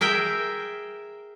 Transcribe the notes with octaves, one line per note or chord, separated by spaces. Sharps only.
G#4 A#4 E5 G5